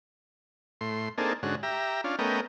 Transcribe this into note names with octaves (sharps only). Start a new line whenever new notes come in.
A2 C6
A#3 C4 D4 D#4 G#4 A4
G#2 D3 C#4 F#4
G4 E5 A#5
C#4 D4 F4
A3 B3 C#4 A#4 D#5 G5